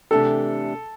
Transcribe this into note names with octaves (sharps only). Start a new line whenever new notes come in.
C3 E3 A3 D4 G4 A4